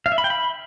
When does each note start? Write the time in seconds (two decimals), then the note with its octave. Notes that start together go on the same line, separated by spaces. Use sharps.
0.06 F5
0.12 E5
0.18 B5
0.24 G5
0.30 B5